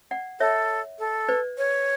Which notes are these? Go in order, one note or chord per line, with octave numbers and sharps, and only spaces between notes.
D5 F#5
A4 C#5 E5
A4
B4 D5
C#5